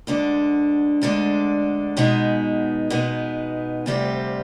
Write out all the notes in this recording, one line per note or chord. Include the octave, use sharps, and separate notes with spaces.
D2 D3 G#3 D4
D2 D3 G#3 D4
B2 G#3 B3 D#4
B2 G#3 B3 D#4
D2 C3 G3 C4 F4